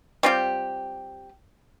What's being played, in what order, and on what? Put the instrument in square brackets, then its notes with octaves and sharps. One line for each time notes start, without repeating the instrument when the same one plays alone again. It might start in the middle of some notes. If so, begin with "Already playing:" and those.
[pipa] G3 C4 F4 G4